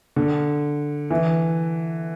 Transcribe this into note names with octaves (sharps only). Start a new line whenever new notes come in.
D3
E3